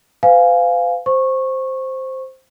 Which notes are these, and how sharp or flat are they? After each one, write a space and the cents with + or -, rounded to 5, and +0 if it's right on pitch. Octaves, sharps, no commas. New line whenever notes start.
B4 +45 F5 +0 G#5 +0
C5 +0 C#6 -15